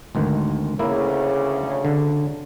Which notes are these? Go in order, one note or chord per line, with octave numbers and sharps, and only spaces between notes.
G#1 D2 D#3
D2 C#3 A#3 E4
D3